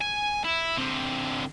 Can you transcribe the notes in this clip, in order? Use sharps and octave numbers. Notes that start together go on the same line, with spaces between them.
G#5
E4
D3 C4